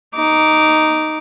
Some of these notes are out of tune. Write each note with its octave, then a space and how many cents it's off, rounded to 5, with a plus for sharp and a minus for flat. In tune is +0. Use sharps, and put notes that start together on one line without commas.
D#4 +0 D6 -10